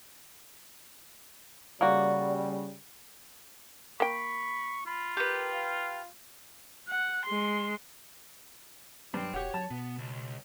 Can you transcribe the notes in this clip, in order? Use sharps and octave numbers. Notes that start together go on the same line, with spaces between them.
C#3 G3 A#3 F#4 D5
A#3 G5 B5 C#6
F4 B5
G4 A#4 B4
F5
F#5
G#3 C6
G2 F#3 C5 G5
E1 F#4 G4 C#5
F#3 A5
B2 B3
C#2